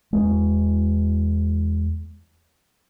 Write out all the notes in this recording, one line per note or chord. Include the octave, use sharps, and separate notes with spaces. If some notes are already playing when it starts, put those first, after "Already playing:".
E2 G#3